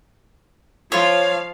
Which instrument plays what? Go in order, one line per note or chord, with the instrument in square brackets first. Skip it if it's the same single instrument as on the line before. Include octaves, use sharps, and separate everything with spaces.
[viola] F3 F5 [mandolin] F4 C#5